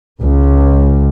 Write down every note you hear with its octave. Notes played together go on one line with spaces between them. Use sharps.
C#2